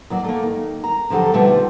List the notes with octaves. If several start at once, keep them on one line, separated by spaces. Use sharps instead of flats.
D#2 F#3 D5
A3 A#3
D#3
A#5
D3 F3 F#3 G4 A4
B2 D3 D#3 F3 G3 A3